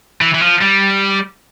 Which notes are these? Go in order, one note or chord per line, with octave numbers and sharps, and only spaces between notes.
E3
E3
F3
G3